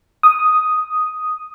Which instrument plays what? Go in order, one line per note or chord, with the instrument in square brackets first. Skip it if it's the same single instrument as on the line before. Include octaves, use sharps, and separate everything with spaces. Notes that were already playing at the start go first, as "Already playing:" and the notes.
[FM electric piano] D#6